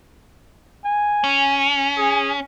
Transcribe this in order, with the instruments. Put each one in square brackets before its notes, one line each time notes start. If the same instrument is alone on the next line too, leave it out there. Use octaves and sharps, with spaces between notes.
[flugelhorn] G#5
[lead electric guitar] C#4
[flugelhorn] G#4